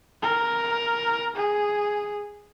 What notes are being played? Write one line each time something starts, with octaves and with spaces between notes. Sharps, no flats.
A#4
G#4